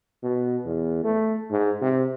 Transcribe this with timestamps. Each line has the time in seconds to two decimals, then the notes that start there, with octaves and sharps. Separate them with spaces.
0.23 B2
0.65 E2
1.04 A3
1.51 G#2
1.81 C3